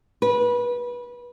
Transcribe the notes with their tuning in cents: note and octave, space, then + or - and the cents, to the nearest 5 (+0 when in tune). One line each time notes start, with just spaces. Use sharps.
B4 -25